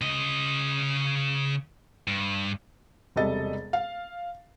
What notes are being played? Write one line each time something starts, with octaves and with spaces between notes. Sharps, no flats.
C#3 D#5
G2
E1 C3 G3 A4 D#5 A6
F5